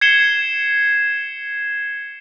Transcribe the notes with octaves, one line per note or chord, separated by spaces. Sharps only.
G#6 C7 C#7 E7 G7